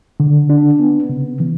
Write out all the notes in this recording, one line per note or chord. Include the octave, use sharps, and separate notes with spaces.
D3
D4
B3
C#3
E3